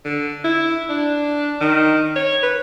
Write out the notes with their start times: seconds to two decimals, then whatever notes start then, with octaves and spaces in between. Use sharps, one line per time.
0.05 D3
0.44 E4
0.89 D4
1.61 D#3
2.16 C#5
2.43 B4